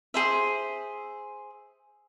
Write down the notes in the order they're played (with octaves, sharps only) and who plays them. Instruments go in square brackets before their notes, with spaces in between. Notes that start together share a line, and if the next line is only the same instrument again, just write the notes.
[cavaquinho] G#4 C5 E5